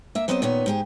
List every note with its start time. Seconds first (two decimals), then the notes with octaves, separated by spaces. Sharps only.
0.15 A#3 E5
0.28 F#3 B3 C4 C5 C#5 D#5
0.42 A#2 D#3 B3 C#4
0.66 G#2 G4 G#4